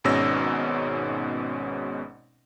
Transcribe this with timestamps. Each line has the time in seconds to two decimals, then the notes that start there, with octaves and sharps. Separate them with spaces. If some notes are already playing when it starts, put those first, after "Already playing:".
0.04 G#1 G#2 B2 C#4 E6 A#6